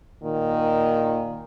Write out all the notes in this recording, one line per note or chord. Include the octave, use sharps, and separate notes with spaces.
A#2 D#3